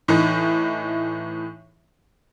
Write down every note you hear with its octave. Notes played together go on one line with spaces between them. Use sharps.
A2 E3 D#4